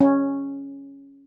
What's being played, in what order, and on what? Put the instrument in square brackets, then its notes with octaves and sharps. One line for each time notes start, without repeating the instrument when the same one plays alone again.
[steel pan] C#4